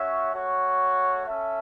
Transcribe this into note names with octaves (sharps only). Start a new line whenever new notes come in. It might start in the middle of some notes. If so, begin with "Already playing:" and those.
Already playing: C#4 F#4 C#5 E5
A3 F#4 C#5
C#4 A4 E5